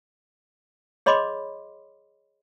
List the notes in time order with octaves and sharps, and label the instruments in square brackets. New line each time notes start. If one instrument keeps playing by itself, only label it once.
[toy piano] G#4 C#5 D#5 B5 C6 D6